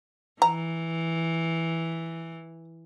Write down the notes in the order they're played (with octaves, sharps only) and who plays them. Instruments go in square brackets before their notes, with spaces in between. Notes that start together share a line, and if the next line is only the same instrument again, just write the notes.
[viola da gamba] E3 [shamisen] A#5